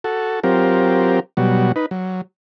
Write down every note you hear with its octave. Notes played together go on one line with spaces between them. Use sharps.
F#4 A4
F#3 C4 F4 G4 A#4
B2 F#3 G3 F#4
D#4 B4
F#3